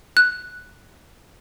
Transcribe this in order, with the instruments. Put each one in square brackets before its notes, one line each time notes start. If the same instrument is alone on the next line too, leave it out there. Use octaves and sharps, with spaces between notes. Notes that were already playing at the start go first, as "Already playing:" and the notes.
[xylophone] F#6